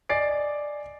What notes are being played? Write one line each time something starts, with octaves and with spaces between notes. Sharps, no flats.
D5 D#5 G#5 A6 C7 D7